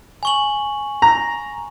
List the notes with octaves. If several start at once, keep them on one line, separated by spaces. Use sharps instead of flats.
G#5 C#6 F#7
A#5